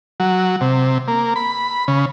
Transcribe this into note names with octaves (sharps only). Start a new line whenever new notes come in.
F#3
C3
A#3
B5
C#3